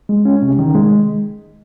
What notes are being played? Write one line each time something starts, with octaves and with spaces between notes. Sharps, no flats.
G#3
C#4
C3
D#3
G#3